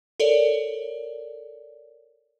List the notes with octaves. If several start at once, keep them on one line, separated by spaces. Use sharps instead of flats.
A4 A#4 C#5 D5